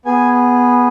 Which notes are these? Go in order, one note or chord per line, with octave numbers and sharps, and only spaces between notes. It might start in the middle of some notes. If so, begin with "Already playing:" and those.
B3 G#4 G#5